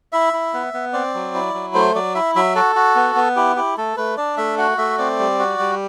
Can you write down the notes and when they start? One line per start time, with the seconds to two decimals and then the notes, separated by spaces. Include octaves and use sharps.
0.12 E4 E5
0.33 E4
0.54 B3
0.74 B3
0.93 C4 D5
1.14 F#3
1.35 E4
1.54 F#3
1.74 A3 C5
1.95 F#3 D5
2.14 E4 E5
2.35 F#3 E5
2.55 F#4 A4
2.76 F#4
2.96 B3
3.16 B3
3.36 E4 G4
3.56 E4 G4
3.77 A3 A4
3.97 A3 B4
4.17 D4 D5
4.37 A3 E5
4.58 F#4 F#5
4.78 A3 E5
4.98 C4 D5
5.19 G3
5.39 F#4
5.59 G3